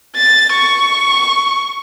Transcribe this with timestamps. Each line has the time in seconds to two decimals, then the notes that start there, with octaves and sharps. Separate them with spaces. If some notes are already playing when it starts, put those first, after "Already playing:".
0.16 A6
0.53 C#6